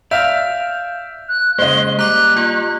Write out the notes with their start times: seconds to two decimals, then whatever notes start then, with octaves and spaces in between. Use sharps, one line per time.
0.11 D5 E5 F5 F6 G6
1.29 F#6
1.59 C#3 G#3 A#3 C5 D#5 G7
1.99 G3 A#5 D6 F#6
2.37 A#3 F4